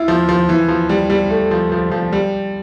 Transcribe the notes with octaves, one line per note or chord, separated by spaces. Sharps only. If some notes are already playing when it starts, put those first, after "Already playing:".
Already playing: E4 F4
F3
F3
E3
F3
G3
G3
A3
F3
F3
F3
G3